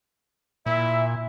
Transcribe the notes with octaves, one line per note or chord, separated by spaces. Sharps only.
A#2 E4 E5